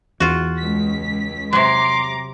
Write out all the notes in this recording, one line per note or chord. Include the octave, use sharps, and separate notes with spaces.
E2 F4 F#4
C#2 B6
C3 F#3 A#5 C6 D6